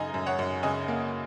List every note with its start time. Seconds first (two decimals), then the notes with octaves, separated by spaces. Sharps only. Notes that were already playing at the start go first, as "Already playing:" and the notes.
Already playing: F#2 C#3 D#4 D#5 G#5 A#5
0.14 F#2
0.26 C#5 F#5
0.39 F#2
0.63 C#3 D#5 G#5
0.88 A#3